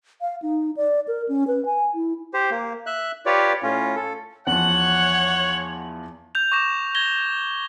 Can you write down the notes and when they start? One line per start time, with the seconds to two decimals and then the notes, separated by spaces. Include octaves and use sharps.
0.21 F5
0.42 D#4
0.77 D5
1.08 A#4
1.29 C#4
1.47 B4
1.66 G#5
1.94 E4
2.34 G4 C5
2.51 A#3
2.86 E5 F#6
3.26 F4 G4 B4 C#5 D5
3.63 A2 C#4 F4
3.96 A4
4.47 E2 F3 C#5 F#5 F#7
6.35 G6 F7
6.52 C#6 D6 A#6 E7
6.95 G#6 A#6 G7